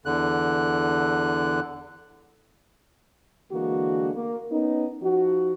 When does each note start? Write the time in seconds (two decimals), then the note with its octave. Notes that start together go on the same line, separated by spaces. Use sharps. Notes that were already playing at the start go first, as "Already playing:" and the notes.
0.05 E2 D3 F#6
3.51 D3 E3 G#3 A#3 F#4
4.14 A#3
4.50 B3 C#4 D#4
5.01 F3 D#4 F#4